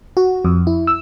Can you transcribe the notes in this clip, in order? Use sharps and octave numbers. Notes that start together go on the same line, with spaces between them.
F#4
F2
E4
E6